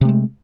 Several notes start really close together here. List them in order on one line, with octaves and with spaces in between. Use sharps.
C3 A3 G#3